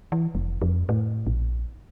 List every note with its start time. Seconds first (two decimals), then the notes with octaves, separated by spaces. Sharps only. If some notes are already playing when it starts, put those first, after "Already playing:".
0.12 E3
0.35 F1
0.62 F2
0.89 A2
1.27 A#1